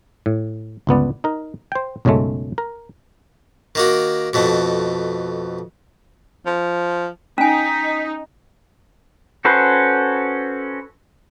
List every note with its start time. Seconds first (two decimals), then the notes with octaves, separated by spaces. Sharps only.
0.26 A2
0.87 G1 C#2 B3 D5
1.24 D#4 A#4
1.72 C5 G5
2.05 B1 F#2 C#3 G#3 A3
2.58 A#4
3.75 D#3 A#3 F#4
4.33 F2 B2 A3
6.46 F3
7.38 C#4 D#4 G#5 B6
9.45 C#4 F#4 A4 B4 C5